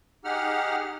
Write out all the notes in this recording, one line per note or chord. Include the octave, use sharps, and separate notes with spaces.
D#4 G4 G#4 F#5 F6